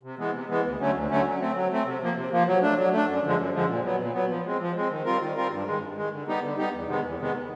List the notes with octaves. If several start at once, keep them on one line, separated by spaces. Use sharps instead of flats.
C3
E3 G#3 B3
C3
E3 G#3 B3
D2
D3 F#3 A3 C#4
D2
D3 F#3 A3 C#4
F#3
A3 C4
F#3
A3 C4
C3
F3 A#3
C3
F3 A#3
F#3
A3 D4
F#3
A3 D4
F#2
D3 F3 G#3
F#2
D3 F3 G#3
A#2
F#3 B3
A#2
F#3 B3
F3
G#3 C4
F3
G#3 C4
D#3
G3 C4 F4 A#4
D#3
G3 C4 F4 A#4
G2
D#3 G#3
G2
D#3 G#3
D3
G3 B3 D#4 G4
D3
G3 B3 D#4 G4
E2
C3 D#3 G#3 B3
E2
C3 D#3 G#3 B3